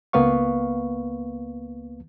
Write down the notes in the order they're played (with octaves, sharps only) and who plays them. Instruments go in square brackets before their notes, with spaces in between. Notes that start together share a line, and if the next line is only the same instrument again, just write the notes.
[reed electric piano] C#2 A#3 B3 B4 F5 C#6